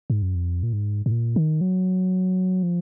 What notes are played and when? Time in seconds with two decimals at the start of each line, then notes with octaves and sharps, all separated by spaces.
0.10 G#2
0.22 F#2
0.35 F2
0.63 A#2
0.73 G#2
1.06 G#2
1.11 A#2
1.36 D#3
1.61 F#3
2.63 F3